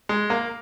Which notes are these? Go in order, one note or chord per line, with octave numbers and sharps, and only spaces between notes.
G#3
A#3